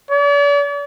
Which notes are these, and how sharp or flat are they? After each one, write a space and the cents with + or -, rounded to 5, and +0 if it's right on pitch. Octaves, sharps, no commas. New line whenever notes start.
D5 -45